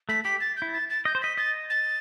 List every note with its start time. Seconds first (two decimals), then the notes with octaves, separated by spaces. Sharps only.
0.09 A3 B6
0.24 G4 B6
0.41 A6
0.57 G6
0.62 E4
0.73 A6
0.90 A6
1.05 D#5 G6
1.15 C5
1.22 D#5 B6
1.37 D#5 A6
1.70 A6